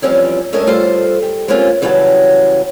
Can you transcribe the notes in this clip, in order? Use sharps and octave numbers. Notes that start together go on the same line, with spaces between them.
E2 G#2 F3 G3 C4 C#4
G2 A3 C#4 A#4 D#5 A5
G3 F4 A4 C5
G4
G#3 A#3 C4 C#4 F4 G4
C#3 E3 F#3 G3 F#5 A5